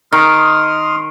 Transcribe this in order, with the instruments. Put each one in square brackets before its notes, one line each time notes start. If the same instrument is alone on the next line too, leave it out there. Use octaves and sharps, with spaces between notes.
[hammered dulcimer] D#3 [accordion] C6 D#6 F6